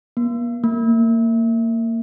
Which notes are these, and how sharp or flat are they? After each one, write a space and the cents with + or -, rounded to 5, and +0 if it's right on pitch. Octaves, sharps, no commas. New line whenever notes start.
A#3 +40
A#3 -25